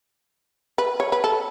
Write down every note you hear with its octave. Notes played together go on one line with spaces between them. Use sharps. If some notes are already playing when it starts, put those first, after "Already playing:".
B4
C#5
B4
A4